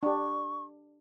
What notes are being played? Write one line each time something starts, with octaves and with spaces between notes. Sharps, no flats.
D4 G4 C#6